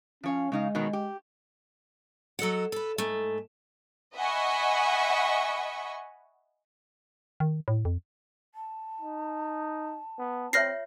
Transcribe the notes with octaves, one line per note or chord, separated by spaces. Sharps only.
F3 C#4 C#5 F5
C#3 G#3 D#4 F5
B2 D#3 F#3
G4
F#3 A4 D#5 F#5
A4 B4
G#2 A3
D#5 E5 F#5 G#5 B5 C#6
D#3
A2
F2
A5
D#4
B3
C4 F4 C#5 E5 F6 A#6 C7